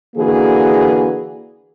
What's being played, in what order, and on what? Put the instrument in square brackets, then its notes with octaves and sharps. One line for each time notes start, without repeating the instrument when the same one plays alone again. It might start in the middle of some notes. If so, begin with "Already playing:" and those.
[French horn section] D3 E3 A#3 F#4 G#4